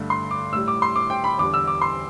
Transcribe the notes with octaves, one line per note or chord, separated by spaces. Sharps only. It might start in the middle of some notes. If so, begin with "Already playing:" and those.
Already playing: G2 D3 A3
C6
D6
A2 G3 E6
D6
C6
D6
G5
B5
E2 D3 G3 D6
E6
D6
C6